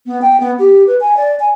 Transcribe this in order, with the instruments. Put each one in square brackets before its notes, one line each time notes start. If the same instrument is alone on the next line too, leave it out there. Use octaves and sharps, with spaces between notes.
[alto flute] B3
G5
B3
G4
B4
G#5
D5
G#5